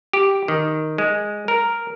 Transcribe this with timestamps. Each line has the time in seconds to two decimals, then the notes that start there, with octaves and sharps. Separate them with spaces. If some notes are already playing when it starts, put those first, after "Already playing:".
0.13 G4
0.48 D#3
0.98 G#3
1.48 A#4